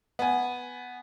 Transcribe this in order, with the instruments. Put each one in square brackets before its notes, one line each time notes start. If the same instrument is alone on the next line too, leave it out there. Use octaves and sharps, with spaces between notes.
[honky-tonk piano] B3 G#5